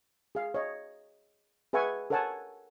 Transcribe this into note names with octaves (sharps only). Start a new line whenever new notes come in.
G#4 F5
C#5 D#5
G#4 B4 E5 F#5 G#5 C#6
A4 A#4 C#5 F#5 G#5 A5